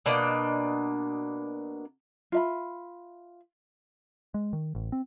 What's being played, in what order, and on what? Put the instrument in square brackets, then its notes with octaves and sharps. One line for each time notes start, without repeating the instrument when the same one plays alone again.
[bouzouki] B2 A#3 D4 D#5
[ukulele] F4 E5 B5
[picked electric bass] G#3
D#3
A1
C4